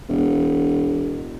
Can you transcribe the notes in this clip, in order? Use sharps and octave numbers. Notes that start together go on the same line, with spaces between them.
E1